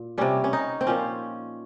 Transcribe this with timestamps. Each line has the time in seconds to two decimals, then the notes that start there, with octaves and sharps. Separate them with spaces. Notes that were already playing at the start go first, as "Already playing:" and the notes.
Already playing: A#2
0.18 C3 G3 C#4
0.44 C#4
0.53 D#4
0.81 C4
0.87 A#2 F3 C#4